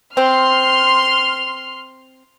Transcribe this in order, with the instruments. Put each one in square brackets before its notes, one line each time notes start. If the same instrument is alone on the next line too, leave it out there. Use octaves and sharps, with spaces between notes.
[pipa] C4 [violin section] C6 F6